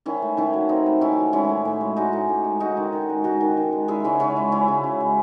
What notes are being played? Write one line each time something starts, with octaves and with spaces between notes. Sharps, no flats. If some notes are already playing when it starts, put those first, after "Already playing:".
D#3 C#4 E4
A3
D#3 C#4 E4
F#3
D#3 C4 D#4
A3
D#3 C#4 E4
F#3
G#3 C#4 E4
A2
A2
G#3
G#3 D#4 F#4
A2
A2
G#3
G#3 D#4 F#4
D#3
D#3
G#3
G#3 D#4 F#4
D#3
D#3
G#3
G#3 E4 G#4
C#3 C#4 E4
C#3 C#4 E4
G#3
G#3 C#4 E4
C#3
C#3
G#3